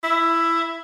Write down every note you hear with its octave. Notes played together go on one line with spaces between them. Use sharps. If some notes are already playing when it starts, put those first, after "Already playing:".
E4